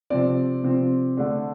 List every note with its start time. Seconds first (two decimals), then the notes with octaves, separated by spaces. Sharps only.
0.10 C3 F3 C4 D5
0.64 C3 F3 C4
1.17 D3 A3 D4